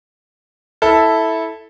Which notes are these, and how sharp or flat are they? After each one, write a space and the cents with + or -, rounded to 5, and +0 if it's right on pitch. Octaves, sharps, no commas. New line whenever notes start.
E4 -10 A4 +0